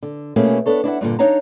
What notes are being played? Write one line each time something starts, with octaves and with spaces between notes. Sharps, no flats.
D3
B2 A3 A#3 C#4 G#4
B3 D4 A4 C#5
D4 E4 D5 F#5
G2 A#2 D3
D4 D#4 C#5 F5 A#5